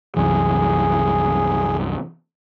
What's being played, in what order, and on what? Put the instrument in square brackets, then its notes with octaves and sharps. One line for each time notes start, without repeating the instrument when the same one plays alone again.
[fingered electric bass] C2 F#2 E3 [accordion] G#4